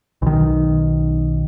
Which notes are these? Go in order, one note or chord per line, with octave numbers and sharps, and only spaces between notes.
B1 D#3